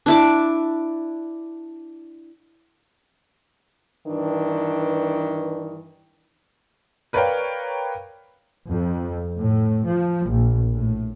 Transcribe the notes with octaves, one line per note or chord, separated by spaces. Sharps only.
D4 E4 D6
G2 D#3 E3 D4
A#4 B4 C#5 D5 F5 G5
F2
A2
F3
A#1
A2